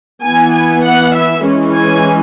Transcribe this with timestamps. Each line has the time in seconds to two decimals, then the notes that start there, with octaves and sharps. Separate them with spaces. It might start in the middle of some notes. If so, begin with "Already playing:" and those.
0.23 E3 B3 G#5
0.53 G#5
0.84 F#5
1.14 E5
1.44 E3 G#3 C#4
1.74 G#5